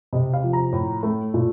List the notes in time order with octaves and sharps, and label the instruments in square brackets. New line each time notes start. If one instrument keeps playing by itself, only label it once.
[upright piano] C3 D#5
F5
F3
A#5
A2
A3
A#2